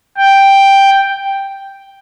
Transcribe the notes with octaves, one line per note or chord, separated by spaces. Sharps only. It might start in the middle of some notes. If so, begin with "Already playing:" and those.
G5